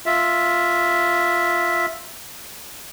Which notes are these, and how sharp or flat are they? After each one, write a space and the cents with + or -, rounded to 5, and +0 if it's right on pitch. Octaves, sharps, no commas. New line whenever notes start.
F4 +0 E5 +0